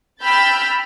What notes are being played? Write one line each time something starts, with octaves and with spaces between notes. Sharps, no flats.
G5 B5 E6 F6 G6 A6